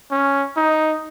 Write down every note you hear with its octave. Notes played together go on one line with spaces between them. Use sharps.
C#4
D#4